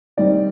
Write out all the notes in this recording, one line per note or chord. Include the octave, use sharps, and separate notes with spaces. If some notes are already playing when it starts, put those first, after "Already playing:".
D#3 G3 C4 D#4 D5